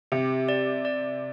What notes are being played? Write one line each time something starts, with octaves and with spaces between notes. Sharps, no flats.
C3 G4
D5
D5